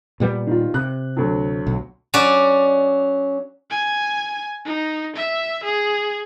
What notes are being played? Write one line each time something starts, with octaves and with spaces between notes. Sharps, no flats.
A#2 G3 B3
D#3 F4
C3 F#6
D2 F#3
B1
F#3 C#4 F#4 D5
G#5
D#4
E5
G#4